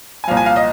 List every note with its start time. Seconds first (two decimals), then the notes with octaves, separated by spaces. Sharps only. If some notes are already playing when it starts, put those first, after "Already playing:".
0.24 G#5
0.28 C2 A#2 F3 F5
0.37 G#5
0.46 F5
0.56 D#5